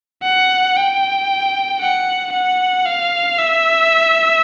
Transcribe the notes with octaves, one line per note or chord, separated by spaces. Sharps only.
F#5
G5
F#5
F#5
F5
E5